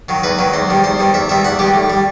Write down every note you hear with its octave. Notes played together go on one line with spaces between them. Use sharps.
D#3 F#3
E2 B4
D#3 F#3
E2 C5
D#3 G3
E2 C5
D#3 G3
E2 E5
D#3 G3 E5
E2 F#5
D#3 G3 G4
A2
G3